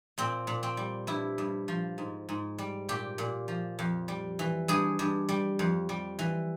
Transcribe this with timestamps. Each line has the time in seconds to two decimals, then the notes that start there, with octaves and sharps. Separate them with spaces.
0.18 A#2 C4
0.47 A#2
0.63 C4
0.77 G3
1.07 G2 E4
1.38 G2
1.68 F3
1.98 G#2
2.29 G#2
2.58 G3
2.89 A#2 G4
3.18 A#2
3.48 F3
3.79 F2
4.08 G3
4.39 E3
4.68 G2 G#4
4.99 G2
5.29 G3
5.59 F2
5.89 G3
6.19 E3